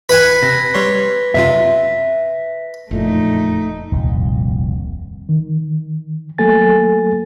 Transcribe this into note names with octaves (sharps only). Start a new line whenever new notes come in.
B4 F#5 G#5 B6
C3 A#6
G3 C#5 C6
F#2 C3 F4 E5 B6
F#1 F2 A#2 A3 D#4
D#1 C2 F2 A#2
D#3
F#3 A3 A#3 A4 G#5 A6